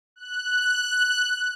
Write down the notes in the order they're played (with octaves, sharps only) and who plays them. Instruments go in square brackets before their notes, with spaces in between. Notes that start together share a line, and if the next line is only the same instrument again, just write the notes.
[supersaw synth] F#6